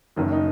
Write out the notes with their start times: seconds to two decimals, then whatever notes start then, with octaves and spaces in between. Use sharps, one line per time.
0.16 F#1 F#2 D#3
0.32 D#4